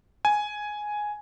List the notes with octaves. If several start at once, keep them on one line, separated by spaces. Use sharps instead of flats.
G#5